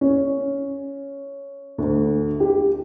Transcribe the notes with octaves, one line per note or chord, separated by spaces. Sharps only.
C#4
D2
G4